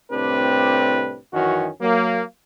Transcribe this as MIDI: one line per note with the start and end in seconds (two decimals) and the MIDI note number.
0.12 1.18 36
0.12 1.18 45
0.12 1.18 60
0.12 1.18 62
0.12 1.18 67
0.12 1.18 71
1.33 1.68 42
1.33 1.68 51
1.33 1.68 52
1.33 1.68 61
1.33 1.68 66
1.81 2.22 54
1.81 2.22 58